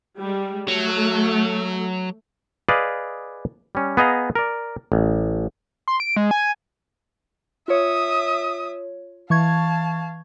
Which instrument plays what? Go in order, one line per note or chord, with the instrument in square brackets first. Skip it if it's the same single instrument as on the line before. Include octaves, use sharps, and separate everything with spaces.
[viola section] G3 G#3
[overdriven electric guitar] F#3 [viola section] A3
[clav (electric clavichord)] G#4 B4 D5 D#5 F5
G3 C#4
B3 G#4 D#5 F5 A#5
A#4 D5
A1
[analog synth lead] C6
D7
G#3
G#5
[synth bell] F4 C#5 [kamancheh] E5 D#6
[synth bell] E3 C#6 G#6 [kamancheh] F5 A5